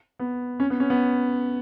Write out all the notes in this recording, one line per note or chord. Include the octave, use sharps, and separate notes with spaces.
B3
C#4
B3
C#4
B3